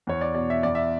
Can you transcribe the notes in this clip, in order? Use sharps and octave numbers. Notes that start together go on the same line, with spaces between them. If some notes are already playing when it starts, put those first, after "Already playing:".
E2 C#5
D5
B2 D5
E5
E2 D5
E5